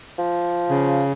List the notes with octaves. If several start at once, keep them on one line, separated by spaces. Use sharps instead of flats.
F3
C#3